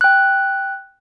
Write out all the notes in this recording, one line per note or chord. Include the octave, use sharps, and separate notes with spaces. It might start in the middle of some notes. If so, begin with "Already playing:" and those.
G5 F#6